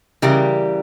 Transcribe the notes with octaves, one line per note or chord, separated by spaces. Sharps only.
C#3 E3 G3 G4 A#4